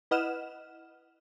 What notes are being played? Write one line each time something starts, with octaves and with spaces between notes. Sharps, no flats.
E4 B4 D#5 F#5 F6 E7